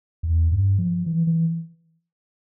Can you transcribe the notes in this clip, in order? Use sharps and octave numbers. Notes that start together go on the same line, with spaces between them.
E2
G2
F3
E3
E3